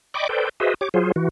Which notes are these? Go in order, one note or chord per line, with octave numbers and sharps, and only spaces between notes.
D5 D#5 G5 B5 C#6 D6
A4 B4 C5 D5 G5
F#4 G#4 B4 C5 D#5 E5
G4 C#5 D6
F#3 F4 G#4 C5
E3 F#4